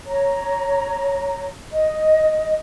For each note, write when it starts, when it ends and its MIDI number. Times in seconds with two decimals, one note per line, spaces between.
0.07 1.48 73
0.07 1.48 82
1.72 2.60 75